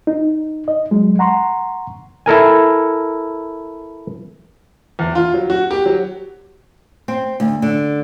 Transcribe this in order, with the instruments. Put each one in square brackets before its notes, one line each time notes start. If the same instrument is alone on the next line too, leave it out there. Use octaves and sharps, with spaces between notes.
[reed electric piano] D#4
D#5
F#3 G#3
F#5 A#5 C6 C#6
[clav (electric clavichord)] E4 A4 A#4 G#5
[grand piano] E2
F4
F#3
F#4
G4
F#3
[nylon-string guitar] C4
D2
D3